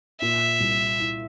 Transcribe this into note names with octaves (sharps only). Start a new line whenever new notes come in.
A#2 E5
C2
E4